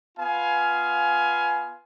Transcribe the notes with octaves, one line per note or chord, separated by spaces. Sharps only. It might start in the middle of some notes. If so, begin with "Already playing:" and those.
B3 F4 F5 G#5